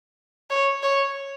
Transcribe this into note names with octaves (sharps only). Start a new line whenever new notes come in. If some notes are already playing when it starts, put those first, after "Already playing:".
C#5
C#5